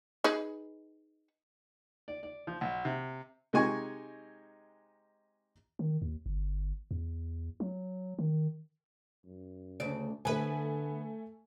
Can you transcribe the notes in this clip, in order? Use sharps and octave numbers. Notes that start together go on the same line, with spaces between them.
D#4 G#4 B4
D5
D5
F3
B1
C3
C3 G#3 D#4 G#5 C#6
D#3
D#2
G1
E2
F#3
D#3
F#2
D2 C#3 D5
D3 A3 B3 B4 G#5